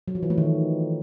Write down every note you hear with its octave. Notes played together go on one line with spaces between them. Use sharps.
F#3
F3
E3
A3
D#3